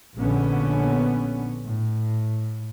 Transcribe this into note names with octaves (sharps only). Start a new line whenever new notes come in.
A#1 D3 B3 C#4
A2